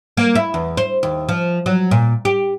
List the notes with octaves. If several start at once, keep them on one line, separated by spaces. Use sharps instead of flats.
A#3
E4
E2
C5
D#2
F3
F#3
A#2
G4